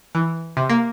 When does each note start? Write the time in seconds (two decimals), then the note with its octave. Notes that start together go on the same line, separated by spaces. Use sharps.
0.15 E3
0.57 C3
0.70 A#3